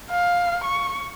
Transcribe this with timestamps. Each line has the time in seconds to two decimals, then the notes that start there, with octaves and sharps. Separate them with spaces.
0.10 F5
0.64 C#6